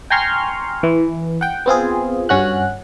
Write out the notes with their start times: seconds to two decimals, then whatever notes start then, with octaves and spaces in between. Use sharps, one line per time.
0.10 G5 G#5 A#5 C6 C#6 F6
0.83 E3
1.41 F#5 G5
1.66 B3 C4 F4 G#4
2.29 G2 C#4 F#4 F#6